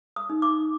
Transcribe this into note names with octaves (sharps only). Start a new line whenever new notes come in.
D#6
D#4
D6